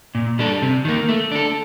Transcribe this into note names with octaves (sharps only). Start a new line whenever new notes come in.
A#2
G3 D4 A4
C3
D#3 A#3
A3
D4 A4